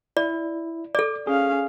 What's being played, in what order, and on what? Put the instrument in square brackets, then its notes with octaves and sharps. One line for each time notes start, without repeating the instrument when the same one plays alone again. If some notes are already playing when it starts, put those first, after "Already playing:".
[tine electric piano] E4 [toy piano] D5
[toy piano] A4 D5 [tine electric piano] D6
[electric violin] C#4 F5 [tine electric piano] G#4